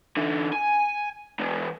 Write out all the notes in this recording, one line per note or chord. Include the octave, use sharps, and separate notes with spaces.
D3 E3
G#5
E3 G#3